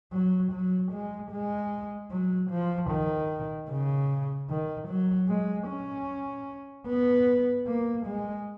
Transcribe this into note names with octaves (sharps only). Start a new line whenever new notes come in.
F#3
F#3
G#3
G#3
F#3
F3
D#3
C#3
D#3
F#3
G#3
C#4
B3
A#3
G#3